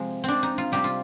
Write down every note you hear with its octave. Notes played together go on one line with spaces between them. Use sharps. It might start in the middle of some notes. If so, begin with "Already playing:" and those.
Already playing: C3 F3 G#3
C4 D4
D#4
F4
C3 G3 G4
F4